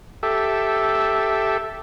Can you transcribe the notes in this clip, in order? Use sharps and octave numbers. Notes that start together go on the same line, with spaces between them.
G4 A4 E5